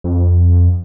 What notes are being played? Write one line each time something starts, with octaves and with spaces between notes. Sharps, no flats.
F2